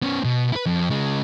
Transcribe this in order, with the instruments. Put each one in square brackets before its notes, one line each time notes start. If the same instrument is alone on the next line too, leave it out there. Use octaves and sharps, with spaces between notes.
[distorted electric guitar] B3 C#4
B2
E4 B4
F2
C#3 G#3